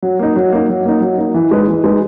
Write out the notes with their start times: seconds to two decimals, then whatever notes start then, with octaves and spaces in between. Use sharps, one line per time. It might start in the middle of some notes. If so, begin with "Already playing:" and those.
0.03 F#3
0.19 A#3 D#4
0.36 F#3
0.52 A#3 D#4
0.69 F#3
0.85 A#3 D#4
1.01 F#3
1.18 A#3 D#4
1.34 E3
1.51 G#3 D#4 G#4 B4
1.68 E3
1.84 G#3 D#4 G#4 B4